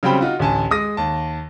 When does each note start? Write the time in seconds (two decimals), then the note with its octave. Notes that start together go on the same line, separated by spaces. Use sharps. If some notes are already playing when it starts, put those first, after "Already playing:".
0.03 C#3 F#3 G3 C4 G5 B5
0.21 D#4 F4 F#4
0.39 A1 D2 G#5 A5
0.71 G#3 D#6 A#6
0.97 D#2 A5